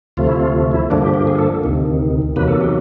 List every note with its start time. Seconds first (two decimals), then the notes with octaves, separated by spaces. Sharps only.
0.17 D2 C3 F3 A3 F4
0.27 E4
0.36 F4
0.72 E4
0.90 G2 D3 F3 A#3 D4
1.02 G4
1.14 G4
1.27 G#4
1.38 A4
1.64 D2 C3 D#3
2.36 E2 C3 D#3 F#3 A#3 B4
2.48 A4
2.60 G4